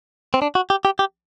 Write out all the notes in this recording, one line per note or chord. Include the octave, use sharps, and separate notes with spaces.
C4
D4
F#4
G4
G4
G4